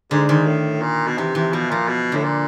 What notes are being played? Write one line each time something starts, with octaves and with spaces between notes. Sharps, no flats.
G#2 D3
G#2 D#3
A2
A#2
B2
C3 E3
C3 E3
B2 F3
A#2 F3
B2
A2 D3
A#2